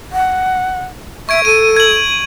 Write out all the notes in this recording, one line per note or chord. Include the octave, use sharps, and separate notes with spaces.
F#5
E5 C#6 G#6 D7
A4 D#7
G#6 F#7